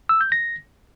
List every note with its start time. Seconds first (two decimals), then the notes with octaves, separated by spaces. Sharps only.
0.09 E6
0.21 G6
0.32 A#6